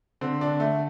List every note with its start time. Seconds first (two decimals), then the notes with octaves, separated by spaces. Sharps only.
0.21 D3 C4
0.41 D4
0.47 D3
0.60 A3